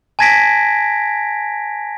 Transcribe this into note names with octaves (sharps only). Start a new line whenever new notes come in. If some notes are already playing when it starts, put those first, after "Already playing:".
G#5 A5 G#6 A#6 B6 D7